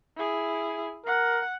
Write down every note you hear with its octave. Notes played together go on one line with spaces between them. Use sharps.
E4 G#4
A#4 F#5